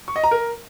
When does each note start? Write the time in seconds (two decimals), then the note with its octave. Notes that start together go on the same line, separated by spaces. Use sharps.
0.08 C#6
0.16 D#5
0.24 A#5
0.31 A#4